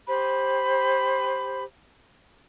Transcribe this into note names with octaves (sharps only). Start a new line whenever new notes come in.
G4 C5 B5